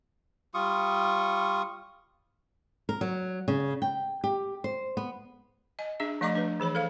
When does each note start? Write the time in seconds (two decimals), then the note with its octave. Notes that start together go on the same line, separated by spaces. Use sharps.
0.54 G3 F4 C#6 D#6
2.89 A#4
3.01 F#3
3.48 C#3
3.82 G5
4.24 G4
4.64 C5
4.97 B3
5.79 D#5 G#5
6.00 D4 G#4 E5
6.21 F3 A3 D5 D#5 A#5 D6
6.35 D4 B4
6.60 E3 G#4 C#5 B5
6.75 A4 C5 F5